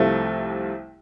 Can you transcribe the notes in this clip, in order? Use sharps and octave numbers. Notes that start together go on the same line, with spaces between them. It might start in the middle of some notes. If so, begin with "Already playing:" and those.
Already playing: C2 C3 F3 A3